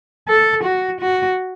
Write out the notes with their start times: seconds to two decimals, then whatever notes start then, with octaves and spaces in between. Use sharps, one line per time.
0.28 A4
0.64 F#4
1.01 F#4